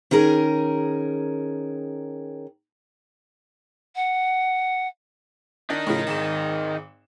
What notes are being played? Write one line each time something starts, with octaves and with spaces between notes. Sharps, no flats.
D#3 C#4 G#4 A#4
F#5
D4 D#4 A#4
A2 C#3 F3
G#1 G#2 E7